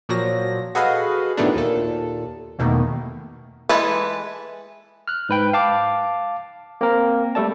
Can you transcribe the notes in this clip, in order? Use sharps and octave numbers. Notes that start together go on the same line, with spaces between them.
A#2 F3 F#3 A#6
F#4 G#4 A4 B4 D#5 F5
A2 D#3 E3 A3 B3 D4
D#2 A#2 A4
E2 B2 D#3 A3 A#3
E3 G#3 A4 B4
F6 F#6
G#2 B4 G5
F5 A5 D6
A#3 C4 A#4
G3 A3 A4 D5 A5